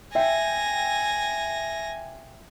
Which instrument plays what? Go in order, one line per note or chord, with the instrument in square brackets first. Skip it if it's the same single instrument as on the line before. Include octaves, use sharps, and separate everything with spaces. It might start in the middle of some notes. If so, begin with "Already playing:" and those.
[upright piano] E5 G5 [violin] G#5 A#6